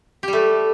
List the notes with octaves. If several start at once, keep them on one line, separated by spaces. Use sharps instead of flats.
G3 A3 G4